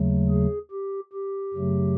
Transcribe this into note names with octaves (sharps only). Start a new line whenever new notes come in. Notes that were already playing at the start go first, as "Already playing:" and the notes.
Already playing: D#2 C#3 F#3 A3
G#4
G4
G4
F#2 C#3 F#3 A3